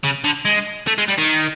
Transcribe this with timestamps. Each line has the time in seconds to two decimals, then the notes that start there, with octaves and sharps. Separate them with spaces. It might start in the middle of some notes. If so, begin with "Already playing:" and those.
0.04 C#3
0.24 D3
0.45 G#3
0.87 A3
0.98 G#3
1.08 G3
1.18 D#3